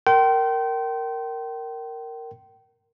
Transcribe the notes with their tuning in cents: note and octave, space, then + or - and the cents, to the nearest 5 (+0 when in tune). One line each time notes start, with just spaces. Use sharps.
A#4 -10 G5 -30 C6 +0